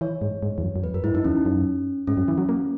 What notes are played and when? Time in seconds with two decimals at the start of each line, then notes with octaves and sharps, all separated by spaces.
0.01 E3 C#5
0.22 G#2
0.43 G#2
0.58 E2
0.63 F#2
0.76 F#2
0.84 E2 B4
0.94 F#2 A#4
1.04 G#2 E4
1.14 F#2 D#4
1.24 E2 C#4
1.45 F#2
2.07 G#2 C#4
2.17 F#2
2.28 E3
2.38 F#3
2.49 A#3